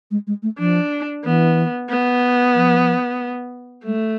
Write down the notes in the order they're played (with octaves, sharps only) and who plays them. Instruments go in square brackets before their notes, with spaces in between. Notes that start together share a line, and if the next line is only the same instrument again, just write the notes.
[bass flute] G#3
G#3
A3
[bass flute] F3 [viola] D4
[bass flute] E3 [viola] B3
[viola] B3
[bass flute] F3
[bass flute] G#3 [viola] A3